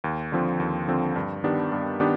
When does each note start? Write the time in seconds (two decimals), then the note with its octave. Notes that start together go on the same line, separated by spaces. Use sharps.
0.04 D#2
0.32 D3 F3 C4
0.60 D#2
0.88 D3 F3 C4
1.16 G2
1.44 D#3 B3 D4 G4
1.72 G2
2.00 D#3 B3 D4 G4